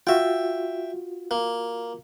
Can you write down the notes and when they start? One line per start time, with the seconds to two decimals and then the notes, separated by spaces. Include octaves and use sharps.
0.07 F4 F#4 E5 G5
1.31 A#3